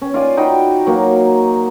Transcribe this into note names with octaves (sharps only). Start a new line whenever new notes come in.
C#4
F4 D5 G#5
D#4 F#4 G5 B5
F#3 A#3